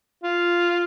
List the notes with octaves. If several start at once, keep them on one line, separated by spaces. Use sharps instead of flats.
F4